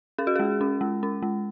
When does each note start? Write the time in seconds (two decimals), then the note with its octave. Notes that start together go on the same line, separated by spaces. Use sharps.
0.18 C#4 G#4
0.27 F#4
0.36 G#3 G#4
0.61 C#4
0.81 G#3
1.03 C#4
1.22 G#3